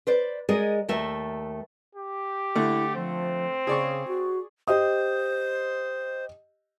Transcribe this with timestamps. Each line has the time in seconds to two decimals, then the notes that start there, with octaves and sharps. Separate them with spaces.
0.07 B4 C5 D5
0.49 G#3 G#4 A#4 D5 D#5
0.88 D#2 A3 A#4 E5
1.95 G4
2.56 D3 A3 E4
2.95 F3 C4
3.67 C#3 G#4 D5 C#6
4.08 F#4
4.68 G4 C5 D#5 D#6